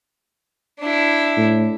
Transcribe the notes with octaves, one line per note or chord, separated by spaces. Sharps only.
D4 E4
A2